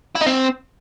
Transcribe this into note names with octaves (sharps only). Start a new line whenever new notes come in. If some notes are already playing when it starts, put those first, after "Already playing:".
E4
D#4
C4